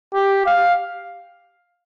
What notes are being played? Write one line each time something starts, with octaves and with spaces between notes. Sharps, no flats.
G4
F5